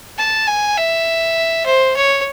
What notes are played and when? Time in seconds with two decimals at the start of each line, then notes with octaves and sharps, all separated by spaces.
0.18 A5
0.48 G#5
0.78 E5
1.66 C5
1.96 C#5